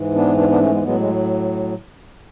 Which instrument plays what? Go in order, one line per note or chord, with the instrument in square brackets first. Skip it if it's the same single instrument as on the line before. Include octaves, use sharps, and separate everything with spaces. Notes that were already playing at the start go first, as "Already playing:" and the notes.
Already playing: [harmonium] G#2 E3
B3 D4
B3 D4
B3 D4
A3 C#4
G#3 B3
A2 F#3 G#3 B3
G#3